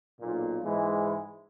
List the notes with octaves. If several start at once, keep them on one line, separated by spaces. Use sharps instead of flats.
B1 A#2
G#2 E3 G#3